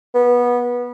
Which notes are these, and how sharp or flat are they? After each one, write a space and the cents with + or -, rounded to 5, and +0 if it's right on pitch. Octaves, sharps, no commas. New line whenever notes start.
B3 -20